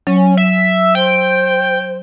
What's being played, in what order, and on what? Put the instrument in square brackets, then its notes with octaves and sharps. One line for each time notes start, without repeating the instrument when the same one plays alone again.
[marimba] F#3 [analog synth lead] C#4
[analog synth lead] E5
[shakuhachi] C5 [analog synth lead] G5